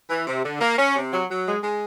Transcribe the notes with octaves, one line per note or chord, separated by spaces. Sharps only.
E3
C3
D3
A#3
C#4
C3
F#3
F#3
G#3
G#3